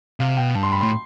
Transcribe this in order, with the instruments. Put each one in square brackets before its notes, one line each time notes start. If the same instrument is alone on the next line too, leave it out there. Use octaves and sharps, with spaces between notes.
[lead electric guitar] C3 [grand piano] F5
[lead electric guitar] B2 [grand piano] G5
[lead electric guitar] G2 [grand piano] A5
[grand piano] C6
B5
[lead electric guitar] A2 [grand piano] C6